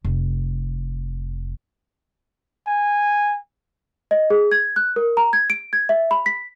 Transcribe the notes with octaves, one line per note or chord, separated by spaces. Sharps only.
F1
G#5
D#5
G#4
G#6
F#6
A#4
A#5
G#6
D7
G#6
E5
B5
B6